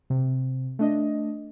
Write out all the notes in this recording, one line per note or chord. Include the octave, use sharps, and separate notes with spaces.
C3
A3 D4 D#5